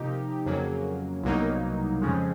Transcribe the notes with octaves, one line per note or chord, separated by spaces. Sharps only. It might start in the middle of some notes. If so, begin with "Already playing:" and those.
Already playing: C3 F3 A#3 D#4 G4
F2 C#3 F#3 A#3
C2 B2 F#3 A#3 D#4
F2 C#3 F3 G#3